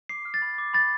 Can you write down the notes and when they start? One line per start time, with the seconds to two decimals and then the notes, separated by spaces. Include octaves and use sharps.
0.09 D6 C7
0.25 F6
0.34 A6
0.42 B5
0.58 D6
0.74 B5 A6